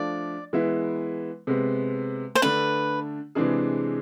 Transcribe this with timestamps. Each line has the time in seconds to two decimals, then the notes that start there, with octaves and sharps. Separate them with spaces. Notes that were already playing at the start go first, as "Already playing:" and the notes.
Already playing: F3 A3 D4 D5
0.53 E3 G#3 B3 E4
1.47 C3 G#3 B3
2.35 C5
2.42 D3 A3 D4 B4
3.35 C3 E3 G#3 D4 G#4